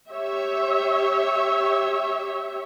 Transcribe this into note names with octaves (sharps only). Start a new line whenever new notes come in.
G4 C#5 E5